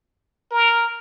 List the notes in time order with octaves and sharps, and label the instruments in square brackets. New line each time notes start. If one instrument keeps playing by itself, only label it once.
[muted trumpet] A#4